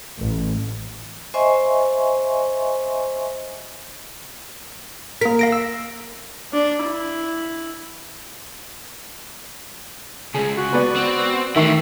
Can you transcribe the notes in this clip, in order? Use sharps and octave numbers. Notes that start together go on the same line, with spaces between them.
A1
C5 D#5 E5 G#5 C6 C#6
A#3 A#4 B6
F5 A#6 D7
E6
D4
E4
C#2 C#3 G#4
F#4
B3 B4 D5
C4
D#3 E3 A3 E5 C#6 C7